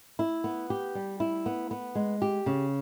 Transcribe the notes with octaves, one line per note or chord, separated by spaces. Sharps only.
E4
B3
G4
G3
E4
B3
B3
G#3
G4
C#3